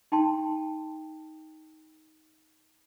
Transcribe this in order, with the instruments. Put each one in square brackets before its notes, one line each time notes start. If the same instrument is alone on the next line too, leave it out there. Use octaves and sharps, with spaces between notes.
[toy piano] D#4 G5 A5 C6